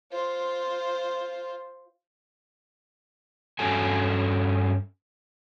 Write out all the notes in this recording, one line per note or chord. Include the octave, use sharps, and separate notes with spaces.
F4 C5
G2 C#4 F#4 A4 G#5